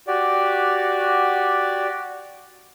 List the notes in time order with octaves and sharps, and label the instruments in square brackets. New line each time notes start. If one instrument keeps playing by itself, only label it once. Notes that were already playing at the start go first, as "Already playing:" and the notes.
[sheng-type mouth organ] F#4 G4 D5